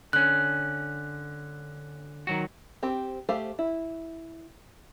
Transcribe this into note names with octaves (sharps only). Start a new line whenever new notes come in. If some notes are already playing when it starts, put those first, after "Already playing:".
D3 C#4 F#6
D#3 F#3 F#4
C4 G4
A3 G4 C5 F5
E4